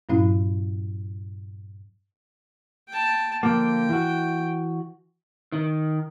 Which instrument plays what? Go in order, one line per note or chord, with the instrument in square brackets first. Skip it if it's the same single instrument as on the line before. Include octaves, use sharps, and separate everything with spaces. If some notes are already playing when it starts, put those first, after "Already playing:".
[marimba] G2 A#2 F#3 C#4 E4
[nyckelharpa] G5 A5
[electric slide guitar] D3 F3 A#3 [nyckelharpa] G5
[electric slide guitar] E3 F#4
[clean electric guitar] D#3